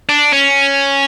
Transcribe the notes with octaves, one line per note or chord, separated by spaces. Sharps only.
D4
C#4